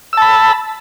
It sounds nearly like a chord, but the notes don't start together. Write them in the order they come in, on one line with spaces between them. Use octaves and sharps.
E6 A5 B5